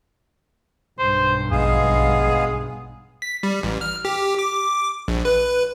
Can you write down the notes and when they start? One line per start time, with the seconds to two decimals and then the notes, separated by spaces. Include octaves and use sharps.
0.99 B1 G2 C5
1.52 A#1 G#3 B3 G#4 F5
3.22 B6
3.43 G3
3.63 A1
3.81 F6
4.05 G4
4.39 D6
5.08 A#1
5.25 B4